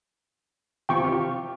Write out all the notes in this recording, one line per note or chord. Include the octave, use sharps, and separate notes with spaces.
C3 F3 G5 C#6 D6
F4 G4